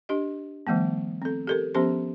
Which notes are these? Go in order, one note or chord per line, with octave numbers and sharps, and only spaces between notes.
D4 G4 D#5
D#3 F3 G3 A3 B3
C4 A4
G4 A4 A#4
F3 B3 C#4 G4 C5 C6